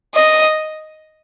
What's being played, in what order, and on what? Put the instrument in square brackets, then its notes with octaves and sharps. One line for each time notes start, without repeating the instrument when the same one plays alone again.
[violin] D#5